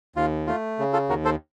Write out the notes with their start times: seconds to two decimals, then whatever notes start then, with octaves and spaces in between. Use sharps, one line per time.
0.16 D#2 F4
0.47 A3 F4
0.79 C#3
0.93 F4 A4
1.09 D#2 F#4 A#4
1.25 A4 C5